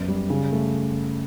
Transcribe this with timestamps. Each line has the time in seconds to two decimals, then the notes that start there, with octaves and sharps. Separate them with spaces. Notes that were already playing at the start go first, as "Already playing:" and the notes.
Already playing: F#2 B3
0.08 G3
0.30 C#3
0.52 A3